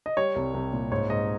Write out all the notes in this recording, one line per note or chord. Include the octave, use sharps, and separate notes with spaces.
D#5
G3 C#5
C2
C2
A#2
G#2 C#5
G#2 D#5